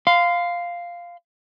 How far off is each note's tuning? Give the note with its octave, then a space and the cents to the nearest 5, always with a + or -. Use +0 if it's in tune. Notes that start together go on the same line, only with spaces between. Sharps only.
F5 +0 C6 -35